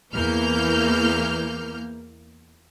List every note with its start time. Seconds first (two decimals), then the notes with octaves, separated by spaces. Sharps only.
0.14 E2 E3 A#3 F6 G6